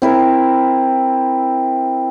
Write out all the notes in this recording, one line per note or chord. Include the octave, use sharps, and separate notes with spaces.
C4 E4 A#4